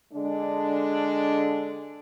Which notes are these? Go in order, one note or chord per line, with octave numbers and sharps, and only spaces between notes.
D3 G#3 D4